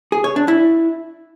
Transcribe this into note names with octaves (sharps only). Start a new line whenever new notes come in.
G#4
C#5
D4
E4